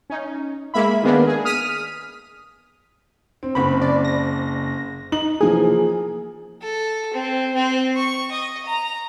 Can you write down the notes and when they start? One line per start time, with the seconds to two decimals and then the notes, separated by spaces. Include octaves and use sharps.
0.10 C#4 D#4
0.74 G#3 A#3 E5 B5
1.03 D#3 G#3 A#3 B3 D4
1.27 G#4
1.45 D#6 F6 B6 D#7
3.43 C4
3.55 F#1 C4 B5
3.82 D5
4.05 A#6
5.12 D#4 F#7
5.41 E3 F3 A#3 G#4
6.62 A4
7.14 C4
7.55 C4
7.96 C#6
8.31 D#5
8.66 A#5